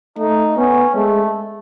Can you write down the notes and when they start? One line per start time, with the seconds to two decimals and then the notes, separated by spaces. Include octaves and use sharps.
0.18 A3 D#4
0.57 B3 C#4
0.95 G#3 A3